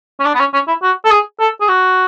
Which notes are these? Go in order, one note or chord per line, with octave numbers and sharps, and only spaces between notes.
C#4
D4
B3
C#4
C#4
E4
F#4
A4
G#4
A4
G#4
F#4